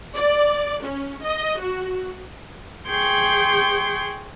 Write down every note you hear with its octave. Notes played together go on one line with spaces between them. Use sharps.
D5
C#4
D#5
F#4
G#4 G5 C6 C#6 G6